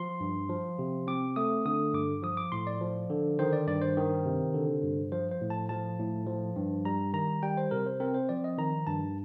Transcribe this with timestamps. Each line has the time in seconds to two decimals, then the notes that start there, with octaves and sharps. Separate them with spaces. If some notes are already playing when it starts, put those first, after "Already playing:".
Already playing: F3 C6
0.20 G2
0.49 F3
0.79 C3
1.07 C4 D6
1.36 A3 D#6
1.66 D3 D#6
1.94 G2 D6
2.23 F3 D#6
2.37 D6
2.52 A2 C6
2.67 D5
2.81 F3
3.10 D3
3.39 D#3 C5
3.53 D5
3.67 G2 D5
3.81 C5
3.97 D#3
4.25 C3
4.54 D3
4.83 G2
5.12 F3 C5
5.31 C5
5.41 A2
5.50 A5
5.69 F3 A5
5.99 A2
6.27 F3
6.56 G2
6.85 G3 A#5
7.13 D#3 A#5
7.43 G3 G5
7.57 C5
7.71 C3 A#4
7.86 C5
8.00 C4 A#4
8.14 C5
8.29 F3 D5
8.44 D#5
8.58 D#3 A#5
8.87 G2 A5